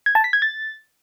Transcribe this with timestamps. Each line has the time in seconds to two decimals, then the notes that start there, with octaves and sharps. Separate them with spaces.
0.06 G#6
0.15 A5
0.24 B6
0.33 G#6
0.42 A6